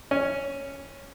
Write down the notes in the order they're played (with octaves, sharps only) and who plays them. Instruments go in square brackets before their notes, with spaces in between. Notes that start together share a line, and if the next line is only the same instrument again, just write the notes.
[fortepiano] C#4